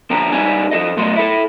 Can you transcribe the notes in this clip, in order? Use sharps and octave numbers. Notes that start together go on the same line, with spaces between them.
D3 F3 C4 G5 A#5
G3 D#4 G4 B4 G#5
F3 A4 D#5
B2 F#3 A3 D#5 C6
E4 A4